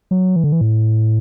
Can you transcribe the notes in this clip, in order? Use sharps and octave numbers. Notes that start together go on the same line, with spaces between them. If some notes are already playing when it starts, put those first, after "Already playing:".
F#3
E3
D3
E3
A2